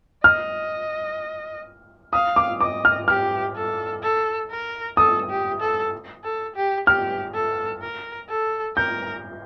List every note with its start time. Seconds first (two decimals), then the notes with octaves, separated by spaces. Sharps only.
0.24 D#5 F6
2.13 F5 D#6
2.36 D6
2.61 D#5 D6
2.85 F6
3.08 G4 F6
3.56 A4
4.03 A4
4.51 A#4
4.97 A4 D#6
5.30 G4
5.60 A4
6.24 A4
6.56 G4
6.87 G4 F6
7.34 A4
7.82 A#4
8.29 A4
8.76 A#4 G6